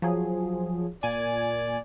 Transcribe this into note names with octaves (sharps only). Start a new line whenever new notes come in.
F3 F#3 G#4
A#2 D5 G#5